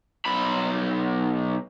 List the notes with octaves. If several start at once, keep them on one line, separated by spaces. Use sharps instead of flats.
B1 B5